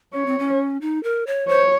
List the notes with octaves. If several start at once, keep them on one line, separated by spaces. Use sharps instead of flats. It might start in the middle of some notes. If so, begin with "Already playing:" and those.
C#4 C#5
C4
C#4
D#4
A#4
C#5
C5 C#5